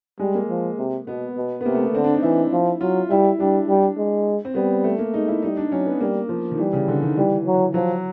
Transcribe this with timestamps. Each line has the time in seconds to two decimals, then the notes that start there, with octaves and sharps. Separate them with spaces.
0.19 G3 G#3
0.35 A#3
0.49 F3
0.78 C3
1.07 B2 B3
1.37 B2
1.61 B3
1.65 C3 A#3
1.74 A3
1.84 B3
1.94 D3 C4
2.04 D4
2.14 D#4
2.23 E3 E4
2.52 F3
2.81 F#3 F4
3.10 G3 E4
3.40 G3 D4
3.68 G3
3.97 G#3
4.45 C4
4.55 G3 B3
4.84 A3
4.98 A#3
5.14 G#3 D#4
5.28 E4
5.42 G3 D#4
5.57 D4
5.71 F#3 C#4
5.86 B3
6.00 G3 A#3
6.29 F3
6.51 D#3
6.58 E3 G3
6.73 C#3
6.88 D3
7.02 D#3
7.17 E3 G3
7.46 F#3
7.74 F3 F#3